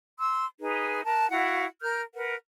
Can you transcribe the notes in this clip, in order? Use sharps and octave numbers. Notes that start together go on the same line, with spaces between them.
C6 E6
D#4 G#4 B4
A#4 A5 F#6
E4 F#4 F5 F#5
A#4 F6 G6
A#4 B4 F#5